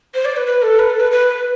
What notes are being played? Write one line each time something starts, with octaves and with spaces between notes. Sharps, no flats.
C5
D5
B4
B4
A4
B4
A4
B4
B4